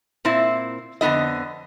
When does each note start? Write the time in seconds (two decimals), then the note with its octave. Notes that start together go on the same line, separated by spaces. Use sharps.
0.25 A#2 C4 E4
1.01 F2 D3 B3 E4 D#5